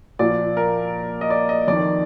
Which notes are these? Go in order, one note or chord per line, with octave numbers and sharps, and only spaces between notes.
A#2 F3 D5
A#4
D#5
D5
D#5
F2 D#3 D5